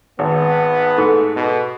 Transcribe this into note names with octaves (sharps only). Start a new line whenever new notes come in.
G#1 B3
G#2 A3
B2